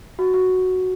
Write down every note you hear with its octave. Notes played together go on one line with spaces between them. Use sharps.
F#4
F#4